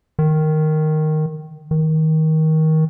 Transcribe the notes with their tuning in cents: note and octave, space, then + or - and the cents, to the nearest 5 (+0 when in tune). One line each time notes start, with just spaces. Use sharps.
D#3 -5
D#3 +20